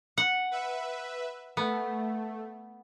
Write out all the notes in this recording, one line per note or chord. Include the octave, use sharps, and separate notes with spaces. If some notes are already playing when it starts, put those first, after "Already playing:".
F#5
B4 E5
A3 B3